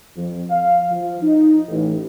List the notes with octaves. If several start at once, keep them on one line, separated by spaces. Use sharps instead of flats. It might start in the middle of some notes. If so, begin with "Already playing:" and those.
F2
F5
F3
D#4
A1